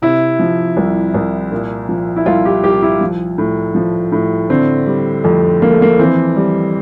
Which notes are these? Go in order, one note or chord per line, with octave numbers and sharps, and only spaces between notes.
C3 E4
F3
C2
C2
A#2
F3
E4
C2 F4
G4
C2 G4
E4
F3
A2
F3
A2
D3 C4
G3
F2 A3
F2 A#3
A3
A#3
E3 C4
G3